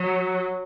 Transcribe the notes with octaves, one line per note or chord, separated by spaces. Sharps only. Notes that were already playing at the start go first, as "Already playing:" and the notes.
Already playing: F#3